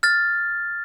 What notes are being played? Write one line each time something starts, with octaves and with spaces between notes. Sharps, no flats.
F6 A6